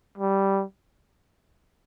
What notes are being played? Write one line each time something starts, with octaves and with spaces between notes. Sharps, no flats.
G3